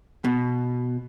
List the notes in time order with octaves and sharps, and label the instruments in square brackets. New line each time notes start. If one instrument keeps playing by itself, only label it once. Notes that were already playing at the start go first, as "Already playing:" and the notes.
[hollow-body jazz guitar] B2